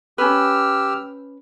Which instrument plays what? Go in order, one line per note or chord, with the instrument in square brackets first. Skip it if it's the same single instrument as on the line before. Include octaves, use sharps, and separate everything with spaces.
[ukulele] C#4 B4 [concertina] G4 E6 F6